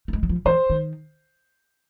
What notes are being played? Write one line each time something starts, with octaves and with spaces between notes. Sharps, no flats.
A3
G#3
F#3
F3
E3 C5
D#3